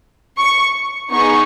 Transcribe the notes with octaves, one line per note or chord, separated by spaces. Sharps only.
C#6
B3 D#4 G#4 C#6